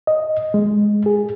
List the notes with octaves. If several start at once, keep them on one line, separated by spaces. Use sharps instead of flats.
D#5
G#3
G#4